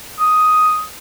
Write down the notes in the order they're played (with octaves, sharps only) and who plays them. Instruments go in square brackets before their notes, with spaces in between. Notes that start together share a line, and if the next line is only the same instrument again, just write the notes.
[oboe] D#6